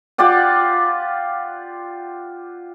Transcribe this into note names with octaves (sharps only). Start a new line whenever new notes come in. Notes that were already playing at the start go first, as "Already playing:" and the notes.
F4 G4 D5 F#5